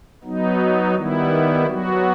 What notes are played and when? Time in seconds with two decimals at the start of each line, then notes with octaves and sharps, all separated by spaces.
0.24 F#3 B3 D#4
0.95 D#3 G3 B3 E4
1.66 F#3 B3 F#4